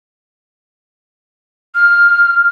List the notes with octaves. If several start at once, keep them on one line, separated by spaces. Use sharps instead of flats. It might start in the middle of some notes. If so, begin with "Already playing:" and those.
F6